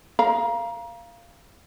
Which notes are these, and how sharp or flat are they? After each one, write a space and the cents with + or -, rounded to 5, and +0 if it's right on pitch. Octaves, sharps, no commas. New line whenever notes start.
A#4 +0 F5 -15 A#5 +25